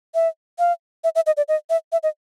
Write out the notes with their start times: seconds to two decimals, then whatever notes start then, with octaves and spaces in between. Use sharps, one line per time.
0.15 E5
0.59 F5
1.04 E5
1.15 E5
1.26 D#5
1.37 D5
1.48 D#5
1.70 E5
1.92 E5
2.03 D#5